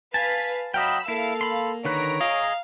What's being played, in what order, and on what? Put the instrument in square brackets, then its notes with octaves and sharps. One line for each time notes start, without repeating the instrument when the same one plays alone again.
[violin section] B4 F5 B6 [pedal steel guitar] G#5 A5
[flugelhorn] F#3 [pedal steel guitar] D#5 F5 G5 [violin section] B5 E6
[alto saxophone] A#3 [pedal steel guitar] E4 [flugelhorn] A4 [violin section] F5
[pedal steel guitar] B5 C6
[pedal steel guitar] D3 D#3 B4 [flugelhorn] C#5 [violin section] A#5 D7
[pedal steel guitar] G#4 D#5 [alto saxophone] F5